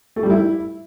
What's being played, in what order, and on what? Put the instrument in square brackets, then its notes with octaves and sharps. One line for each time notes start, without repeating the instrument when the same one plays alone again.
[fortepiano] A3
G3
E4